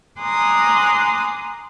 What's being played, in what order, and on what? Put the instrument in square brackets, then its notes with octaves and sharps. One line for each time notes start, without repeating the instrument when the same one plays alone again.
[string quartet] G#5 A#5 C6 D6 D#6 F#6